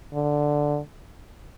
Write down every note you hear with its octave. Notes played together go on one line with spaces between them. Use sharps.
D3